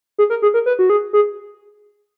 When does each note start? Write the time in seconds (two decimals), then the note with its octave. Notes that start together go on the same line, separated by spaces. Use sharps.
0.18 G#4
0.30 A#4
0.42 G#4
0.54 A#4
0.66 B4
0.79 F#4
0.90 G#4
1.13 G#4